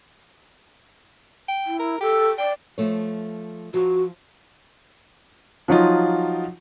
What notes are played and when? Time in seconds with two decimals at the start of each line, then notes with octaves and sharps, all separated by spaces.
1.48 G5
1.66 E4
1.79 A#4
2.01 G4 A4
2.38 D5 G5
2.78 F3 A3 C#5
3.74 F3 F#4
5.68 F3 F#3 D#4 F4